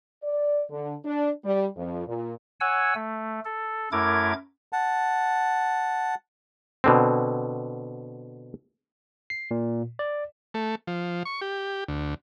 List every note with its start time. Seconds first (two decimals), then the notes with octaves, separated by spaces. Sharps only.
0.22 D5
0.69 D3
1.03 D4
1.43 G3
1.75 F2
2.06 A#2
2.61 C#5 F#5 G#5 E6
2.95 A3
3.45 A4
3.92 F#2 A3 E4 A#4 D6 G#6
4.73 F#5 A5
6.84 B2 D3 C4
9.30 C7
9.51 A#2
9.99 D5
10.54 A3
10.87 F3
11.25 C#6
11.41 G4
11.88 D2